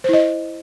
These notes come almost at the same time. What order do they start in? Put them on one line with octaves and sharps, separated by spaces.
C5 E4 D#5